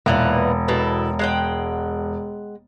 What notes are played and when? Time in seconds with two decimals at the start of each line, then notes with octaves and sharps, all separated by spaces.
0.06 E1 A#2 E3 B3
0.68 B2 E4 A4
1.19 G#3 F#5 G5